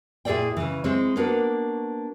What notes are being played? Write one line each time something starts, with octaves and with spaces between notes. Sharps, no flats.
A#2 E4 G#4 A4 D5 G5
C#3 E3
G#3 C4 E4 C#5
A#3 B3 D4 F#4